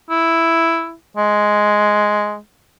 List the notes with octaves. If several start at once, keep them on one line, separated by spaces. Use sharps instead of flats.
E4
G#3